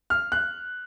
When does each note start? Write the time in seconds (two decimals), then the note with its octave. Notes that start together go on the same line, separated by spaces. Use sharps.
0.10 F6
0.32 F#6